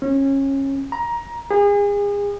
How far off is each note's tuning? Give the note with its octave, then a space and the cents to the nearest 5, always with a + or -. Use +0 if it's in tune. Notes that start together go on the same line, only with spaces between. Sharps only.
C#4 -25
A#5 +20
G#4 -35